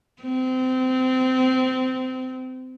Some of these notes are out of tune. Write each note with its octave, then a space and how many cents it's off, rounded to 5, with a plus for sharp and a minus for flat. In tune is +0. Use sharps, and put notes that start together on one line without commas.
C4 -25